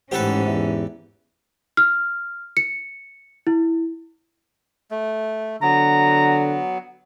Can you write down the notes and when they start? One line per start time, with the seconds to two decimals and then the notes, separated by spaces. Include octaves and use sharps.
0.12 A1 G#2 C#4 G4 A4 B4 C5 F#5
0.47 E2 E5
1.77 F6
2.57 C#7
3.47 E4
4.91 A3
5.63 D3 F#3 B3 A#5